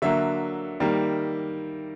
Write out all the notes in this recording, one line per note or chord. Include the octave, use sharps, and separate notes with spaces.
D3 F#3 A#3 E5
D#3 G3 A#3